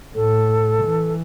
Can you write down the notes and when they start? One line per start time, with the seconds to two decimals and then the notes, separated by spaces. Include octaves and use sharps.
0.15 A2 A4
0.83 E3